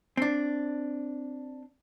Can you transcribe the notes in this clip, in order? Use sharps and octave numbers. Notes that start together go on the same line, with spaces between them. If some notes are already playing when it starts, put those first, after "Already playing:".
C4 D4